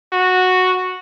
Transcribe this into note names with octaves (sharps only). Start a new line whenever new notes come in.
F#4